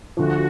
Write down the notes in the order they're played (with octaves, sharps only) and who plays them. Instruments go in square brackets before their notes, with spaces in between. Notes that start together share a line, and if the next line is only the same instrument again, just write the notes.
[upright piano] D2 D3 F3 [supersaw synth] F#4